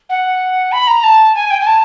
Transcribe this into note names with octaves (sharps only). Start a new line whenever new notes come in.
F#5
B5
A#5
A5
G#5
G5
G#5
A5